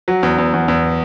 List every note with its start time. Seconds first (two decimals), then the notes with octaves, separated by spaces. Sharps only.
0.08 F#3
0.23 E2
0.38 E2
0.53 E2
0.68 E2